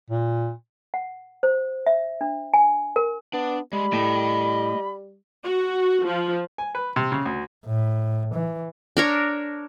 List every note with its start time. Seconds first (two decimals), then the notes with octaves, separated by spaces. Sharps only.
0.10 A#2
0.94 F#5
1.43 C5
1.87 E5
2.21 D4
2.54 G#5
2.96 A#4
3.33 B3 D4
3.73 G3 G#3 B5
3.93 A2 D#5 G5
5.44 F#4
6.05 F3
6.58 G#5
6.75 B4
6.96 C3
7.12 C#3
7.26 D2
7.66 A2
8.35 E3
8.97 D4 A#4 C#5